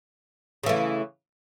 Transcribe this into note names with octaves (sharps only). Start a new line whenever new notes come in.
C#3 E3 A3